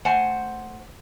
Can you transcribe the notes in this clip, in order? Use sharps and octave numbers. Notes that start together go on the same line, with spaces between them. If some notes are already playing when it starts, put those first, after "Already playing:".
A3 C5 F#5 G#5